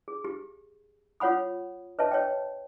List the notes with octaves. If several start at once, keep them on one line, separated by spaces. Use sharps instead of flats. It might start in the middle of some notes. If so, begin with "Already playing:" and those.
G#4
G4
F4 C#5 F#5 B5 D#6
B4 C#5 D#5 E5 A5
C#5 D#5 G5